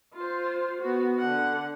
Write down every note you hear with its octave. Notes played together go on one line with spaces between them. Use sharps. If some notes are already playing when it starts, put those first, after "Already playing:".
F4 C5
B3 F#4
D3 F#5